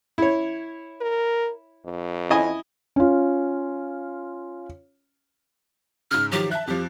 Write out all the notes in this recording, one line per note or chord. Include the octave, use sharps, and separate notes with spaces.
E4 C#5
A#4
F2
E4 D#5 G#5
C#4 F4
G#2 C#3 F6
D#3 F3 F#3 G4
E5 A5 F#6
F2 F3 G4